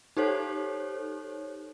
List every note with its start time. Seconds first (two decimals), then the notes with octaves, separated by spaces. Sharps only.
0.17 D#4 G4 A4 C5 C#5